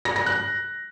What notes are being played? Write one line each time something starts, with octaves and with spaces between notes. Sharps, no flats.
A#6
A#6
F#6